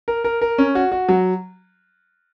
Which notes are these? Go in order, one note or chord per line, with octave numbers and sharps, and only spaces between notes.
A#4
A#4
A#4
C#4
F#4
F#4
F#3